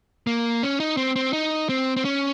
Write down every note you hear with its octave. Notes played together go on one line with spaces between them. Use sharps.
A#3
C#4
D#4
C4
C4
D#4
C4
C4
C#4